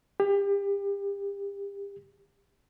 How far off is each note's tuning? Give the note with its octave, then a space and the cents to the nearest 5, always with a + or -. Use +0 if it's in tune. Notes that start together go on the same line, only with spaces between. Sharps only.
G4 +35